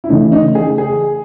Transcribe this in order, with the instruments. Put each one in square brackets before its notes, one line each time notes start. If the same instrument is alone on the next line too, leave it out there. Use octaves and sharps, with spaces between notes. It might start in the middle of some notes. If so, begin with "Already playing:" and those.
[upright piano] E4
[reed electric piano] C#3 E3 A3 C#4 [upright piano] D#4
[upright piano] D#4
G#4
G#4